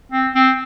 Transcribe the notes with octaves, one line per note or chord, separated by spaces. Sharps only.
C4
C4